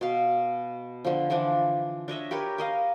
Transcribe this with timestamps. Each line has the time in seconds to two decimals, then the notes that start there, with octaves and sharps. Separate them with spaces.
0.01 B2 F5
1.05 D3 F3
1.30 D3 E3 F3 D4
2.08 D4 C#5 D#5 E5
2.31 G4 A#4 B4 C#5
2.58 A#4 D#5 F5